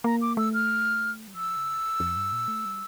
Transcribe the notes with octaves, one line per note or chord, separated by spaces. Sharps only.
A#3 A#5
D6
A3 E6
F6
G3
F3 E6
C#3
F2
F2
G2
A#2
A3
G3